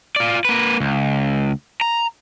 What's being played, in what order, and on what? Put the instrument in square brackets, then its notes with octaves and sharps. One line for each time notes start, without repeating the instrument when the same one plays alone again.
[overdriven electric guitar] F4 D5
A#3 B4
C#2
A#5